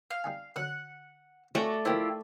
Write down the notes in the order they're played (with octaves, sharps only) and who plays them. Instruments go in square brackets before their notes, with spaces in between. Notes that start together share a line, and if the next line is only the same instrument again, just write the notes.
[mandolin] F5
[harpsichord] G3 D#4 G#5
[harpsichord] D3 F#3 [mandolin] F#5
[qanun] A3 D5 [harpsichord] C4 C#4 F4 [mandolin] F#4
[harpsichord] F3 A#3 C5 [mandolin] E4 F4 G4